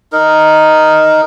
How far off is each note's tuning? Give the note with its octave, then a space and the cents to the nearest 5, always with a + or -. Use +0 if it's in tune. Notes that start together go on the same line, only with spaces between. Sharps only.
D#4 +0 A#4 +0